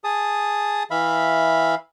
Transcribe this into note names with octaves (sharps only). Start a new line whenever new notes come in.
G#4 A5 D#6
E3 E5 F5 B5